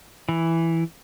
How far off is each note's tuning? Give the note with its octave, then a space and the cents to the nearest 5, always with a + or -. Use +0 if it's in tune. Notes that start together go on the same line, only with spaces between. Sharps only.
E3 +0